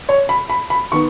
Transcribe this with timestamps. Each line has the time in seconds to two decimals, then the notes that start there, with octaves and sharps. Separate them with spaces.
0.09 C#5
0.29 B5
0.50 B5
0.70 B5
0.92 D#3 B3 C#6